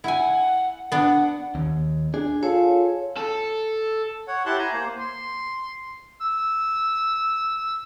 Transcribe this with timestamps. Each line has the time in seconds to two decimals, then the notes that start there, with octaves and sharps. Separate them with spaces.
0.04 E4 F#5 G#5
0.92 B3 D4 F#5
1.55 D#2
2.14 D4 G#4
2.43 F4 G#4 A4 C#5
3.17 A4
4.28 C#5 F#5
4.46 E4 G4 F#5 A5 C6 F#6
4.58 G#5 A#5
4.73 A#3 C5
4.99 C6
6.21 E6